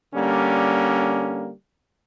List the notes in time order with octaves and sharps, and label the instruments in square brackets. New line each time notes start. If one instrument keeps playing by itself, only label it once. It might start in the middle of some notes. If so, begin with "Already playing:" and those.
[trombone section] D3 G3 A#3 C#4